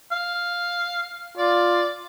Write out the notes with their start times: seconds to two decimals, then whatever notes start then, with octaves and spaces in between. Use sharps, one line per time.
0.12 F5
1.38 F4 D5